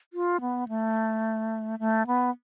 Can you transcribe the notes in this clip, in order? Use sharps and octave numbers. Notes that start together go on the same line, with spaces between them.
F4
B3
A3
A3
B3